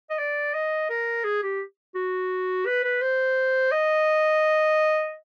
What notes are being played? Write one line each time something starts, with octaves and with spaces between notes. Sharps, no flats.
D#5
D5
D#5
A#4
G#4
G4
F#4
B4
B4
C5
D#5